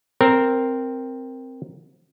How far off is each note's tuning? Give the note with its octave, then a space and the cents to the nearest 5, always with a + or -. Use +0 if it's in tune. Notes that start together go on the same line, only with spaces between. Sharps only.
C4 +0 A#4 +0